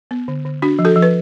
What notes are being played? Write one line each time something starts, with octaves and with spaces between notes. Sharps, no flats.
B3
D3
D3
D4 F#4
F3
F#4 A4
F3
B4